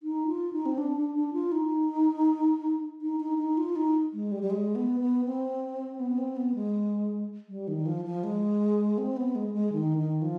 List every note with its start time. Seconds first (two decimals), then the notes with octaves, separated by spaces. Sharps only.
0.03 D#4
0.28 F4
0.53 D#4
0.66 C4
0.78 D4
0.96 D4
1.15 D4
1.33 F4
1.52 D#4
3.01 D#4
3.20 D#4
3.38 D#4
3.57 F4
3.76 D#4
4.14 G#3
4.32 G3
4.42 G3
4.50 G#3
4.75 B3
5.00 B3
5.25 C4
6.00 B3
6.18 C4
6.36 B3
6.55 G#3
7.49 G3
7.68 D#3
7.86 F3
8.05 F3
8.24 G#3
8.98 C4
9.17 B3
9.35 G#3
9.54 G#3
9.73 D#3
9.98 D#3
10.22 F3